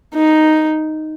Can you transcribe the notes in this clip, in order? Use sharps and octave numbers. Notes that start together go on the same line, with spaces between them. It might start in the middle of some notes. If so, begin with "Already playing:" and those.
D#4